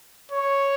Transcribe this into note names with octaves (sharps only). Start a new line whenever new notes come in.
C#5